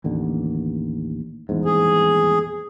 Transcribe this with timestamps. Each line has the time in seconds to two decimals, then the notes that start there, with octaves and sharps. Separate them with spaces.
0.04 A1 D#2 D3
1.49 D#1 E2 G#2
1.65 G#4